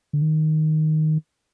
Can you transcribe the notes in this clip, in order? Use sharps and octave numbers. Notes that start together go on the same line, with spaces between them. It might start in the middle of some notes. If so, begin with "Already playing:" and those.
D3
D#3